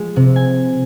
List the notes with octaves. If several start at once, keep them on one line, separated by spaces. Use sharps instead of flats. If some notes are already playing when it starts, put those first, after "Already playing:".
Already playing: F3 G#3
C3
G#5